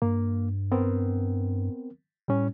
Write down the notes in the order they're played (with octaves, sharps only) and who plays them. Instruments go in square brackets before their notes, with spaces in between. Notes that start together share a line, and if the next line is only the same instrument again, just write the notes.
[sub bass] G2 [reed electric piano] A#3
[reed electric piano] B3 C4 A#4
[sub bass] A2 [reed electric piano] G3 C#4